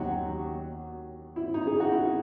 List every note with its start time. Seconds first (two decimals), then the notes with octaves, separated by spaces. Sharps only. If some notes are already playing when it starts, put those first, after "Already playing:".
Already playing: D#2 D#3 F#3 F#4
1.36 E4
1.54 D#4
1.67 G#4
1.80 F#4
1.92 E4